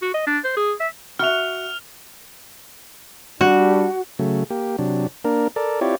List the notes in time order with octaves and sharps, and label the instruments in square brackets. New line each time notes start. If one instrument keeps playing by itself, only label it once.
[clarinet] F#4
D#5
D4
C5
G#4
E5
[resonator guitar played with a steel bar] F#4 E5 [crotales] F6 F7
[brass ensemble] G3 D4 [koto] F#4
[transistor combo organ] C#3 F#3 A3
A#3 G4
C3 F#3 D4
A#3 D4 A#4
A4 A#4 D5
C4 E4 F4 G4 C#5 D5